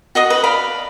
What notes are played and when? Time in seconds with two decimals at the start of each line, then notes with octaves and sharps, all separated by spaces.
0.15 F#4 D#5 D#6
0.30 B4
0.43 D5 F5 B5